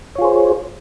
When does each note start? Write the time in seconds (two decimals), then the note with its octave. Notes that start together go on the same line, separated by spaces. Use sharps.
0.15 C#5
0.18 F4
0.21 G#4
0.24 C5